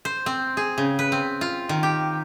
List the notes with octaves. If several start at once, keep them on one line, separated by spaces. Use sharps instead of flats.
C5
C4
G#4
C#3
B4
C4
F4
D#3
G4